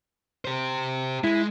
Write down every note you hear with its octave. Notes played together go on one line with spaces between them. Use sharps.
G4 C5
G#3 E4